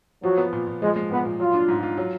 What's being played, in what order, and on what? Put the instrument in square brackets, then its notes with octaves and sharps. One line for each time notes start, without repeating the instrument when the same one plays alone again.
[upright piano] F3 [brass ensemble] F#3
[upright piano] B3
A#2
A#2
[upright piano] F3 [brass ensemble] G#3
[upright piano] G#3
[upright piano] A#2 [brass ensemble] B3
[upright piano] A#2
[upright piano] F#3 [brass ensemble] F4
[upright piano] D4
G#2
F4
F#3